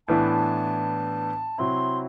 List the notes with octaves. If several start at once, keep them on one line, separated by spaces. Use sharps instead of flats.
A2 E3 B3 D4 A5
C3 F#3 C4 E4 C6